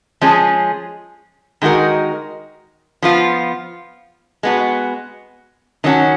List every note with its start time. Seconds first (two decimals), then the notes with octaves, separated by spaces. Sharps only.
0.21 F3 G#3 C#4 G#4
1.62 D#3 G#3 D#4 F#4 A#4
3.02 F3 B3 F4
4.43 G#3 B3 F#4
5.84 D#3 F#3 C#4 F#4